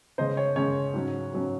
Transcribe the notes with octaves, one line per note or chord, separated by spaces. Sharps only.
C#3 G#3 C#4 C5 D#5
C#5
C#3 G#3 C#4 C#5
G#2 F#3 C#4
G#2 F#3 C#4